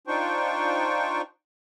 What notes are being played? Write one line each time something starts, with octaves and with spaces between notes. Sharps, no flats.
D4 D#4 F4 C5 G5 C#6